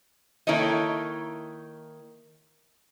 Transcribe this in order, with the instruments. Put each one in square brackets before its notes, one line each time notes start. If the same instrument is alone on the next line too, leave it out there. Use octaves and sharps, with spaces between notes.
[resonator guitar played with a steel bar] D#3 A#3 E4 A4 C#5 D#5